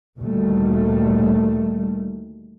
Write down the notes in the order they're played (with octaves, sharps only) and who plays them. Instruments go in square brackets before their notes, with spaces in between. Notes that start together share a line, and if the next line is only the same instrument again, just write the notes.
[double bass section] D2 A#2 D#3 G3 A3